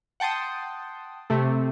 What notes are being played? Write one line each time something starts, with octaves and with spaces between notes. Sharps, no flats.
F#5 G5 A5 C6 D#6
C3 A3